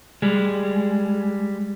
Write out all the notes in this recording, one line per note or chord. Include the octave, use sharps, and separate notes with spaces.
G3 G#3